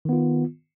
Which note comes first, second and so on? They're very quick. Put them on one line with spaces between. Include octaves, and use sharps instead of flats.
D#3 B3 F4